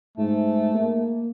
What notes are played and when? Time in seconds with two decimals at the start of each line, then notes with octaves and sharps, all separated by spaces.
0.18 G#2 A3
0.74 A#3